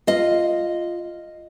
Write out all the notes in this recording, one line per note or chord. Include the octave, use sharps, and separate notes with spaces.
F4 D#5